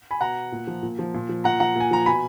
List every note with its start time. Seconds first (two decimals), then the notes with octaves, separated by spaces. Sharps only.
0.11 G#5 B5
0.21 B2 F#5 A#5
0.52 A#2
0.67 F3
0.83 A#2
0.99 F3
1.14 A#2
1.29 F3
1.44 A#2 F#5 A#5
1.60 F3 F#5 A#5
1.76 A#2 G#5
1.91 F3 A#5
2.06 B2 G#5 B5